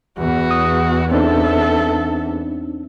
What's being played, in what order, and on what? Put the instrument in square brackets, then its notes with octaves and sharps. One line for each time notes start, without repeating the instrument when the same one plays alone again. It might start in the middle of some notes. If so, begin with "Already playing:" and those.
[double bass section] E2 [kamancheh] F#4
[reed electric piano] D#6
[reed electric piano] C4 D4 D#4 [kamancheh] A4 E5